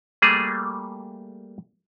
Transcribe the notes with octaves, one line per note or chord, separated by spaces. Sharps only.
G3 A3 A#3 G#4